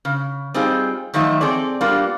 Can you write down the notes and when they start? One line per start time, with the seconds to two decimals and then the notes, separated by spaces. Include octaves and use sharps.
0.05 C#3
0.54 G3 C4 D#4 F4 G#4
1.14 D#3 F3 F#3 A3 D#4 E5
1.41 C4 G#4 A4 D5
1.81 G3 A#3 B3 D4 F4